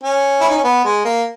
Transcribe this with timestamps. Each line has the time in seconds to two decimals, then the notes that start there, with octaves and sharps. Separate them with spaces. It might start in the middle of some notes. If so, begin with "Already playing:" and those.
0.03 C#4
0.41 E4
0.49 D#4
0.56 C#4
0.64 B3
0.85 G#3
1.05 A#3